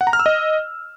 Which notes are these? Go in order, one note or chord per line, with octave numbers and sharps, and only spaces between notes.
F#5
A#5
F6
E6
D#5